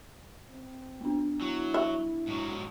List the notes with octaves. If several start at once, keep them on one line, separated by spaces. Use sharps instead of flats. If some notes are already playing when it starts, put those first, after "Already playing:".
C4
B3 D4
F#3 E4
E5
G#2 F#3